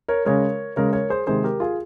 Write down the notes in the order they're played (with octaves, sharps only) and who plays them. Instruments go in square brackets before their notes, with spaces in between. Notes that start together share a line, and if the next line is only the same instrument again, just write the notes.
[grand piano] A#4 C#5
C#3 G#3 A#4 C#5
C#3 G#3 A#4 C#5
A#4 C#5
G#4 C5
C3 D#3 G#3 G#4 C5
G4 A#4
F4 G#4